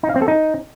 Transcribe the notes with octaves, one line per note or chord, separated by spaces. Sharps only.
D#4
F5
C4
A4
D#4